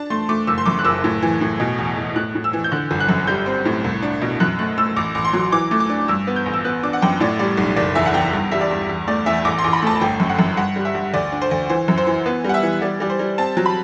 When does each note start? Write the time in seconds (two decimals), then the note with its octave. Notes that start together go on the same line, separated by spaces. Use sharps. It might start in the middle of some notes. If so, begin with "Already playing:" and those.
Already playing: D4 A5
0.10 A3 C6
0.29 A3 D6
0.47 F#1 E6
0.58 C6
0.66 F#2 D6
0.79 F#6
0.85 F#1 E6
1.04 A2
1.22 E3
1.41 A2
1.60 B2
1.78 E2
1.97 E2
2.16 A2 F#6
2.35 A2
2.44 E6
2.53 E3
2.64 G6
2.72 D3 F#6
2.91 G1
3.00 F#6
3.09 F#2
3.27 G3 G6
3.46 C4
3.65 A2
3.84 C2
4.02 D4
4.21 B2
4.40 F#2 F#6
4.59 A3 F#6
4.78 A3 E6
4.96 A1 D6
5.15 A1
5.25 C6
5.33 F#3
5.52 E3 D6
5.71 A3
5.80 D6
5.89 D4
6.08 G2 E6
6.27 B3
6.36 G6
6.46 A1
6.54 E6
6.64 B3 F#6
6.83 D4 D6
6.93 F#5
7.02 F#2 G5
7.20 A2 D5
7.39 G3 D5
7.57 B1
7.76 F#1 D5
7.95 E2 E5
8.06 F#5
8.14 E2 G5
8.33 G2
8.51 G3 E5
8.61 D5
8.71 G2
8.89 E2
9.08 A3 D5
9.26 E2 E5
9.45 A1 D6
9.59 C6
9.64 A1
9.73 B5
9.82 A3 A5
10.01 G1 G5
10.20 F#2
10.29 F#5
10.39 F#2
10.57 G2 F#5
10.76 G3
10.85 E5
10.95 G2
11.14 D2 D5
11.32 D4
11.42 C5
11.51 D2
11.69 E3 C5
11.88 F#2
11.98 C5
12.07 E3
12.26 B3
12.44 G3 F#5
12.54 E5
12.63 E3
12.82 G3 D5
13.00 G3 D5
13.10 C5
13.19 G3
13.38 C4 A5
13.57 F#3
13.66 B5